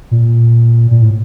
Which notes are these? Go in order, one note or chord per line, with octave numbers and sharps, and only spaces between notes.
A#2
A#2
A2